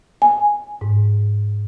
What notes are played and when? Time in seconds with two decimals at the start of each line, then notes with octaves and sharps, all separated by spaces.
0.22 G#5
0.81 G#2